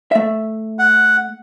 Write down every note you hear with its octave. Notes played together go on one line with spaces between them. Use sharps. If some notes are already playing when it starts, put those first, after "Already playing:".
A3 E5
F#5